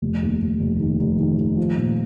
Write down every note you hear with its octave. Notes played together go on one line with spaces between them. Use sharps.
F1
D#2
D#2
F1
D#3
F1
D#3
D#3
F3
A#2